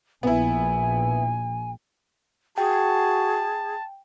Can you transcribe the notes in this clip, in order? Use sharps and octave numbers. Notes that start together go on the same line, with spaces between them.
A#1 B3 E4 G#5
F#4 G#4 G5 A5